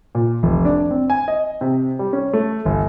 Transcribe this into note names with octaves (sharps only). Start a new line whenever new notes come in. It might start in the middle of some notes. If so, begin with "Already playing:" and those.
A#2
F1
D4
C4
G#5
D#5
C3
G3
C#4
A3
G1